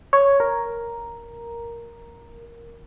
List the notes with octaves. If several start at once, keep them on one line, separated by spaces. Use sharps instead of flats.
C#5
A#4